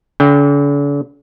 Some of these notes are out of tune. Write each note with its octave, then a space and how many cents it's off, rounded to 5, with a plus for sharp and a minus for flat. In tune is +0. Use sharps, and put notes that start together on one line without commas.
D3 -45 G5 +20